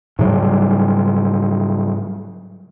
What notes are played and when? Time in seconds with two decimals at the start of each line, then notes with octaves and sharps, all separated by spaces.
0.19 G#2 C#3 F#3 G3